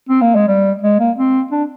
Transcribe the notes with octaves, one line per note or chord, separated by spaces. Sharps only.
C4
A#3
G#3
G3
G#3
A#3
C4
D4